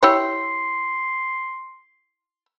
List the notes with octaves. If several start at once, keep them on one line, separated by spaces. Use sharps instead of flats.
E4 G4 C#5 C6